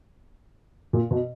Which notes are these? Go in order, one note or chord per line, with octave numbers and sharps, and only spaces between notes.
A#2
B2